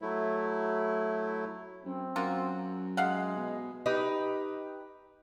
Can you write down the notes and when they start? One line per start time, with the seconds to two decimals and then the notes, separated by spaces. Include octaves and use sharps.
0.02 F#3 A3 E4
1.85 F#2 C4
2.16 F#2 A#3 F4 F#4
2.97 C3 G#3 F5 F#5
3.37 B2
3.86 D#4 G4 B4